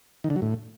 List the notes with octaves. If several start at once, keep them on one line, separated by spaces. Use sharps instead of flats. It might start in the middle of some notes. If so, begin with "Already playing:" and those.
D#3
D3
F#3
A2